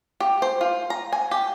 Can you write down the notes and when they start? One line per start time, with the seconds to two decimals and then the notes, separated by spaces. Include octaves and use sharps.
0.20 G4
0.42 C5
0.61 F4
0.90 A#5
1.12 G#5
1.31 G4